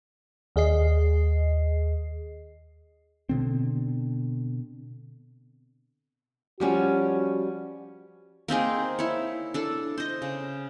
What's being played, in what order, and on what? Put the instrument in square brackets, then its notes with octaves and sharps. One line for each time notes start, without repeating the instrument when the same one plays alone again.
[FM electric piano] D#2 G#4 D#5 C7
[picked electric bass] B2 D3 C4
[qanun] F3 G3 C#4 [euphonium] F#4
[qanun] A#3 C4 D#4 G#4
E4 C#5
D4 A4
C5 D#5
C#3